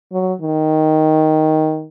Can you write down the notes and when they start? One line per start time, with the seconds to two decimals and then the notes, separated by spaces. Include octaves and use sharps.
0.13 F#3
0.42 D#3